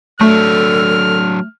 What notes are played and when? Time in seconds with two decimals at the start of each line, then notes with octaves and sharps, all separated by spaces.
0.21 F#3 A3 D4 A4 F6